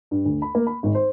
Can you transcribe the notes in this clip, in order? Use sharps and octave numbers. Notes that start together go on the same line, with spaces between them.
G2
D2
B5
A#3
B5
G#1
C5